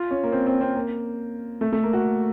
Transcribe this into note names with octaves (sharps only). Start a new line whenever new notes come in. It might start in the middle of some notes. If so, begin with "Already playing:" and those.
Already playing: F4
C#4
A#3
C4
C4
C4
A#3
A3
A3
A#3
F#4